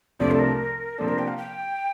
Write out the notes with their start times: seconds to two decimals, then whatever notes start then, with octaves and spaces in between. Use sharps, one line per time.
0.19 C2 C3 F3 A3 D4 D5
0.31 A4
0.39 A#4
0.98 C3 F3 A#3 D4 A4
1.08 A#4
1.19 G5
1.28 F5
1.37 G5